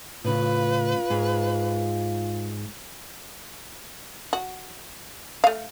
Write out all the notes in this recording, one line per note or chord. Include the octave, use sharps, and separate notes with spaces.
A2 C#3 F4 B4
G#2 G#4
F#4
A3 F5